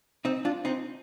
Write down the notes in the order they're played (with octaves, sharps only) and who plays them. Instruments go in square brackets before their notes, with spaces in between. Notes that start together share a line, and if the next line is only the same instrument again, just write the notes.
[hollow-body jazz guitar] C4 D#4
D4 F4
C4 D#4